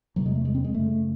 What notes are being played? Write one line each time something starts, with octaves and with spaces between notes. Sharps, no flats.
E2 C3 F#3
G#3
A3
G#3
C4
G#3
F#2 C#3 A3